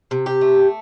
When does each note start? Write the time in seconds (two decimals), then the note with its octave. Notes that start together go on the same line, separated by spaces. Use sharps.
0.11 C3
0.26 G4
0.41 A3